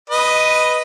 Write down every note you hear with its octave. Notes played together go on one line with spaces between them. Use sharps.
B4 D#5